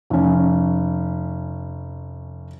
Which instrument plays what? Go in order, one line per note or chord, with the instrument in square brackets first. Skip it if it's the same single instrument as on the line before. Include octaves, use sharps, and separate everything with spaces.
[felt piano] F1 C#4